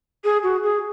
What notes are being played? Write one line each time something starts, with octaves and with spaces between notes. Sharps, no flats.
G#4
F#4
G#4